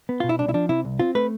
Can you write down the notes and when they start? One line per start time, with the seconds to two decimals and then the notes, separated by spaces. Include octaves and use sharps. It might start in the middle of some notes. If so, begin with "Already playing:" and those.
0.09 B3
0.20 B2 F4
0.29 E4
0.39 C2 D4
0.49 E4
0.54 F3 D4
0.69 C3 E4
0.85 C2
0.99 C4 F4
1.15 A3 B4